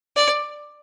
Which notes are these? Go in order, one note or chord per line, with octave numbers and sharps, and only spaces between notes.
D5